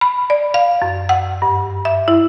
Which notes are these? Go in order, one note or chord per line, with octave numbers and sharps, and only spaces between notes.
B5
D5
F5
F#2
F#5
G2
E5
E4